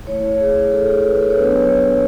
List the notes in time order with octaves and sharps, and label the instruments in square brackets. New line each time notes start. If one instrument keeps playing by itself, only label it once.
[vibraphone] A3 E4 C#5
G#4
A4
G#4
B4
A4
C#5
F#3 B3 D4 B4
C#5